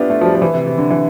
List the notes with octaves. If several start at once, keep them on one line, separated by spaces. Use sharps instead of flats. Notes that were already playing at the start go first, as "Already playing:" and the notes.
Already playing: B3 D4 E4 F4 G4
A3
F3
G3
F3
E3
C3
C3
D3
E3